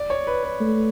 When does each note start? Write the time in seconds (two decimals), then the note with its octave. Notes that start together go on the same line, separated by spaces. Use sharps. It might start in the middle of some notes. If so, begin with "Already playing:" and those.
Already playing: D5
0.10 C#5
0.27 B4
0.43 B4
0.60 A3